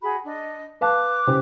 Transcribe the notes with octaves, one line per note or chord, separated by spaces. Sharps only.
F#4 G#4 B5
D4 D#5
B4 F5 A5 D6 F#6
C#3 G4 C5